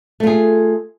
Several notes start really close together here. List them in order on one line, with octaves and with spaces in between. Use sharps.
A3 F4 G#4